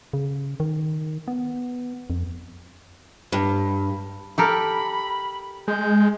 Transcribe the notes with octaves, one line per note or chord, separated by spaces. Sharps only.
C#3
D#3
B3
F2
G2
G4 A4 A#4 B5
G#3 G6